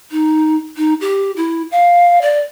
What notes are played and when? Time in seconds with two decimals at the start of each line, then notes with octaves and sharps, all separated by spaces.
0.11 D#4
0.77 D#4
1.01 G4
1.36 E4
1.71 F5
2.22 D5